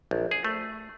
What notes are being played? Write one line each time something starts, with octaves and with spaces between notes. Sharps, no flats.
A#1
G#4
A3